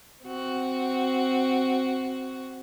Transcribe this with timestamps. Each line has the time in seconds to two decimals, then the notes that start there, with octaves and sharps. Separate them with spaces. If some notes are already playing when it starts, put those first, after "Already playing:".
0.23 C4 F#4